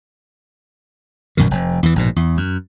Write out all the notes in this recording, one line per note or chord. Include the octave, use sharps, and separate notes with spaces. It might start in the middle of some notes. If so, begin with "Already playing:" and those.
A#1 F#2 B2 D#3
F1
E2 E3
A#1 G#2 B2
E2
F#2